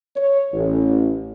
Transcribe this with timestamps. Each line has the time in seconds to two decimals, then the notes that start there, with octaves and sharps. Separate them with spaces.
0.16 C#5
0.53 A1